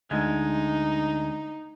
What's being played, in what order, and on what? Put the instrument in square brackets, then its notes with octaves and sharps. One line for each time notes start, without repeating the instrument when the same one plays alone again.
[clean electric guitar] D2 G#3 [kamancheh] D#4